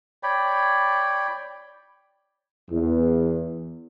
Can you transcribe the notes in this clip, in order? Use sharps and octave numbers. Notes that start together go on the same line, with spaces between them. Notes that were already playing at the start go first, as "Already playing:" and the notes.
C#5 D5 G5 B5
E2